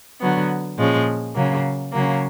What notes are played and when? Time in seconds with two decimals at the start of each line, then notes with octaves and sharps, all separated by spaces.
0.20 D3 F#3 B3
0.78 A#2 F3 G#3 C#4
1.35 C#3 F#3 A#3
1.92 C#3 F#3 A#3